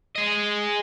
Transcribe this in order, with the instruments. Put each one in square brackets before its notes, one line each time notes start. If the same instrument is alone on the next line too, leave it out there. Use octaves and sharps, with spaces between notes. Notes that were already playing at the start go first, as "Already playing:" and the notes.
[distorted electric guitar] G#4 D#5